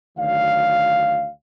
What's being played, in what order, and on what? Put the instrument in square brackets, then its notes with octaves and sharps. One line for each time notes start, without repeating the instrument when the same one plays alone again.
[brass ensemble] D2 D#3 F#3 D5 F5